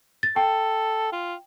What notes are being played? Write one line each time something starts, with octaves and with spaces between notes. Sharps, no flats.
A6
A4 G5
F4